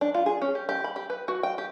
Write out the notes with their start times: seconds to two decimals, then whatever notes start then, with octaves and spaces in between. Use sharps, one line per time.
0.01 D4
0.14 F4
0.26 G#4
0.42 C#4
0.55 G4
0.69 G4
0.84 B5
0.96 G4
1.10 B4
1.28 F#4
1.43 G5
1.58 G4